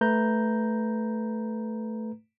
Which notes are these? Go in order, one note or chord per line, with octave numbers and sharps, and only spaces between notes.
A3 B4 A#5 G6